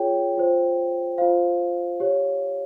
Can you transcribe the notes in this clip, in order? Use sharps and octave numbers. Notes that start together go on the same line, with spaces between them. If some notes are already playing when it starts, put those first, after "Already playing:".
Already playing: F4 G#4 C#5 G5
F4 C5
F4 C5 F5
G4 C#5